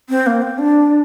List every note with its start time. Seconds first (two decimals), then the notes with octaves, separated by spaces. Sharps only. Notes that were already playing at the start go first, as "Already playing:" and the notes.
0.09 C4
0.27 A#3
0.42 C4
0.58 D4